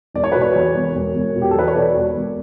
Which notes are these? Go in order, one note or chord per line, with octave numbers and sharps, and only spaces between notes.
E1 D5
C#5
B2 B4
C#5
E2
E1
E1
E1
B2
G4
A4
E2 B4
C#5
B2 D5
E1
E1